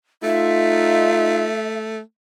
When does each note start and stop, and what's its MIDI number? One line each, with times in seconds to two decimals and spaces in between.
0.23 2.00 57
0.23 1.50 63
0.23 1.50 65
0.23 1.77 76